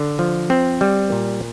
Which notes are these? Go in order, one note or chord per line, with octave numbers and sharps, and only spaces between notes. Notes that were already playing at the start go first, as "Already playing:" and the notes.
Already playing: D3
F3
C4
G3
A#2